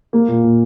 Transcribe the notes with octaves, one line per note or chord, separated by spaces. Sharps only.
A#3
A#2
A#2